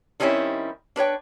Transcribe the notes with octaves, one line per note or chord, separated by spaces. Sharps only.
D#3 G3 C4 C#4 D#4 E4
D4 B4 C#5 G5